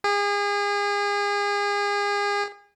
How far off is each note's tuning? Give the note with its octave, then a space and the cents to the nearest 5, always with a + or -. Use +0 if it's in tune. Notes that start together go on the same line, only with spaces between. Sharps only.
G#4 -35